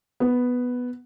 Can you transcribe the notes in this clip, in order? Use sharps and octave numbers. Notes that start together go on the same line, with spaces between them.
B3